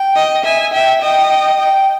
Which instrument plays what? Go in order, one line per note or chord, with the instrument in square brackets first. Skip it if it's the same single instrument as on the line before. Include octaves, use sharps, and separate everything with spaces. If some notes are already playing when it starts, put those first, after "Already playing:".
Already playing: [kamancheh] G5
[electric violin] D#5
[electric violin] E5 [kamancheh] G#5
[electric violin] E5 [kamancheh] G5
[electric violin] D#5 [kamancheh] G5
[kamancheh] G5
G5